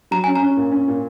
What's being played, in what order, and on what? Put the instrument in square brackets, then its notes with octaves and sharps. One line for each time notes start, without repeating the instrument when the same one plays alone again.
[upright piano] F#3 [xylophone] A#5
[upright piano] C#4 [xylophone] G#5
[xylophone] A#5
[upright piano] C#4
A#2
C#4
A#2